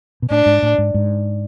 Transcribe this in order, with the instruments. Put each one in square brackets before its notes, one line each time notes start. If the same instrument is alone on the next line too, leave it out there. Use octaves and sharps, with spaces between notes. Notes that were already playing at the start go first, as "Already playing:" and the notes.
[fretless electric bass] B2
[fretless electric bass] A2 [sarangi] D4
[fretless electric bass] G#2
A2
G#2
G#2